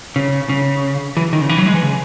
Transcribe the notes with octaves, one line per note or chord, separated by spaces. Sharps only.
C#3
C#3
E3
D#3
C#3
E3
F#3
G#3
E3
C#3